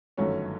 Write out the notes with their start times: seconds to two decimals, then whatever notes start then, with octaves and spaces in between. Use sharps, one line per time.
0.17 G1 F#2 D#3 F#3 A3 C#4 C#5